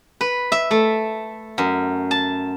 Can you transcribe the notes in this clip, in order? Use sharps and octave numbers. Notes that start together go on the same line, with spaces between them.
B4
E5
A3
F#2
A5